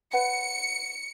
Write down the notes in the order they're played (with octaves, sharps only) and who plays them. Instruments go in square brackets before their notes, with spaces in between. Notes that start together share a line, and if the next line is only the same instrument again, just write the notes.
[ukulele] B4 C#5 F#5 [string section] C#7